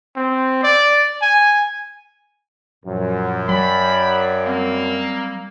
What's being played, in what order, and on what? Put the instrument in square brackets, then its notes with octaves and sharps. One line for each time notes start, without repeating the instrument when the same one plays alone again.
[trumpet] C4
D5
G#5
[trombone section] F#2 [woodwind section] A#2 F3 F#3
[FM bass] F#3 [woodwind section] C#5 D5 G5 [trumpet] B5
[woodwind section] G3 C4 F5 [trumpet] A#3